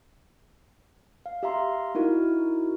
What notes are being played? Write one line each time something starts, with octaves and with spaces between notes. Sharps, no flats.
F5
G4 E5 F5 A#5 C6
D#4 E4 F#4 A#4